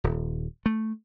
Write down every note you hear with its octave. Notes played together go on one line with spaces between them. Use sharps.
D#1
A3